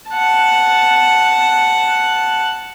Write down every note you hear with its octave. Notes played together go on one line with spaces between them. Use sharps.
F#5 A5